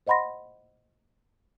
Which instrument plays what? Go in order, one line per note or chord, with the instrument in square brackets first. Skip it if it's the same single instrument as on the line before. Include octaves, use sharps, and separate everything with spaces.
[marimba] C5 D#5 F#5 B5 C6 A#6